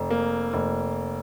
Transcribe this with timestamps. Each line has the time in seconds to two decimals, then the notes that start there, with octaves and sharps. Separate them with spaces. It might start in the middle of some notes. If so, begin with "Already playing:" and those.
Already playing: F1
0.10 A#3
0.53 F1